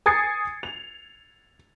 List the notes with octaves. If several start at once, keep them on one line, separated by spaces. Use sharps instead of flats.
G#5 D#6 G#6 A6 C7 C#7
F7